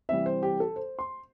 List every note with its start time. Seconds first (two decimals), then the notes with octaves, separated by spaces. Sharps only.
0.09 C3 E3 G3 E5
0.26 C5
0.43 G4
0.60 A4
0.76 C5
0.99 C6